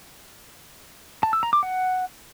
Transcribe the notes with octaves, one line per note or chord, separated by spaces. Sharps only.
A5
E6
A#5
D6
F#5